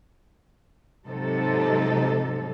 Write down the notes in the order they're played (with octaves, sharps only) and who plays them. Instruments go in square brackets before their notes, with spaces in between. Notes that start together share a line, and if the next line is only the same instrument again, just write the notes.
[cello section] G#2 C3 F3 F#3 D#4 A4